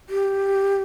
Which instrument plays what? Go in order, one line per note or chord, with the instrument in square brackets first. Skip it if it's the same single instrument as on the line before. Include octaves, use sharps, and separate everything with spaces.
[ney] G4